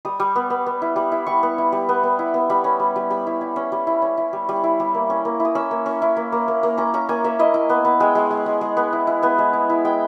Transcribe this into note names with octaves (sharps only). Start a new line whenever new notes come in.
G3 D#6
G3
B3
B3
B3
E4
G3
E4
G3 C#6
B3
E4
G3
B3
B3
E4
B3
G3 B5
C#4
G3
G3
G3 B5
E4
E4
C#4
G3
E4
C#4
E4
G3
G3
E4
G3
A#3
C#4
A#3
E4
D#6
C#4 E6
A#3
C#4
E4
A#3
A#3
A#3
A#3
C#4 A#5
C#4 A#5
A#3 G#5
A#3 E5
E4 D#5
E4
B3
B3
G#3 G5
G#3
G#3
G#3
G#3
B3
E4
E4
B3 G#5
G#3
E4
E4
G#3 G5